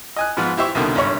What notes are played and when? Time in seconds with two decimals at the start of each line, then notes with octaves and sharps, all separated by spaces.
0.16 D#5 G#5 F#6
0.37 G#2 F3 B3 F4
0.57 E4 G4 C5 E5 C#6
0.75 C2 B2 D3 D#3
0.95 G#1 G2 C#5